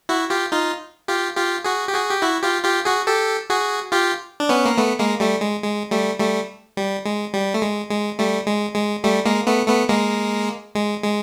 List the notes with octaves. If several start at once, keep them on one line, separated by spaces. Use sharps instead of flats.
E4 F#4
F4 G4
D#4 F4
F4 G4
F4 G4
F#4 G#4
G4
F#4 G#4
G4
E4 F#4
F4 G4
F4 G4
F#4 G#4
G4 A4
F#4 G#4
F4 G4
D4
B3 C#4
A#3
A3 B3
G#3 A#3
G3 A3
G#3
G#3
G3 A3
G3 A3
G3
G#3
G3
A3
G#3
G#3
G3 A3
G#3
G#3
G3 A3
G#3 A#3
A3 B3
A3 B3
G#3 A#3
G#3
G#3